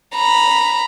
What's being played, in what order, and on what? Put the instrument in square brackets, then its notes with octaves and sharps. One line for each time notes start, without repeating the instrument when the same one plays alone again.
[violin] A#5 B5